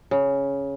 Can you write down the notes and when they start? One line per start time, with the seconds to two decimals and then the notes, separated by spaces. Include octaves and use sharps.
0.11 C#3